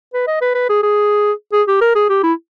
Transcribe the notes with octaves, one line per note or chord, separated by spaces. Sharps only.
B4
D#5
B4
B4
G#4
G#4
G#4
G4
A#4
G#4
G4
E4